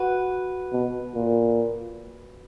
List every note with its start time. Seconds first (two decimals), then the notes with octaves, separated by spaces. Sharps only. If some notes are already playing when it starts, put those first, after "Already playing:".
Already playing: F#4 B4
0.73 B2
1.14 A#2